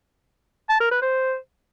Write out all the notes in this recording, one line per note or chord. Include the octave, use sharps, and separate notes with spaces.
A5
A#4
B4
C5